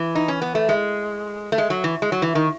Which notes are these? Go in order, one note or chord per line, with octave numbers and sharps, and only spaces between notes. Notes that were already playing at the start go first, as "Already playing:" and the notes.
Already playing: E3
D#4
C#4
B3
A3
G#3
A3
G#3
F#3
E3
G#3
F#3
E3
D#3